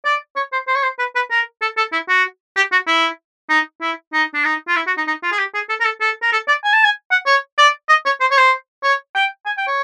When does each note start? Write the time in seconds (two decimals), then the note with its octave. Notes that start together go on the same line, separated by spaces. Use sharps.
0.05 D5
0.36 C#5
0.52 C5
0.68 C5
0.75 C#5
0.83 C5
0.99 B4
1.15 B4
1.30 A#4
1.62 A4
1.77 A4
1.93 E4
2.09 F#4
2.56 G4
2.72 F#4
2.87 E4
3.49 D#4
3.81 E4
4.13 D#4
4.34 D4
4.45 D#4
4.68 F4
4.76 E4
4.87 F#4
4.97 D#4
5.07 D#4
5.23 F4
5.32 G#4
5.38 G4
5.54 G#4
5.69 A4
5.80 A#4
5.85 A4
6.01 A4
6.22 A#4
6.32 A4
6.48 D5
6.64 G#5
6.74 A5
6.84 G#5
7.11 F#5
7.26 C#5
7.58 D5
7.89 D#5
8.05 C#5
8.21 C5
8.31 C#5
8.37 C5
8.83 C#5
9.15 G5
9.46 G#5
9.58 G5
9.67 C#5